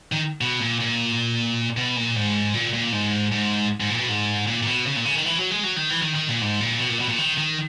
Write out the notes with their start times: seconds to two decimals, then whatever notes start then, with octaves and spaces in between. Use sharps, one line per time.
0.12 D#3
0.41 B2
0.60 A#2
0.80 A#2
1.77 B2
1.96 A#2
2.16 G#2
2.54 A#2
2.73 A#2
2.92 G#2
3.32 G#2
3.80 G#2
3.90 A#2
3.99 B2
4.09 G#2
4.47 A#2
4.63 A#2
4.67 B2
4.86 C#3
4.96 A#2
5.05 C#3
5.16 D#3
5.26 E3
5.38 F#3
5.51 G#3
5.64 F#3
5.76 D#3
5.90 E3
6.02 D#3
6.15 D#3
6.29 A#2
6.41 G#2
6.60 A#2
6.79 B2
6.89 A#2
7.00 B2
7.08 A#2
7.18 D#3
7.38 D#3